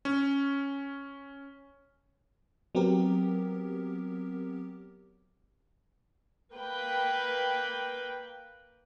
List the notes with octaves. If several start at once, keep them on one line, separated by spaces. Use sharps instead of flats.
C#4
F#3 B3 C4 G4 A#4
A#3 B4 G5